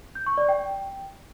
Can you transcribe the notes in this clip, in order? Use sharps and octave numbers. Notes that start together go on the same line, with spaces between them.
G6
C#6
D5
G5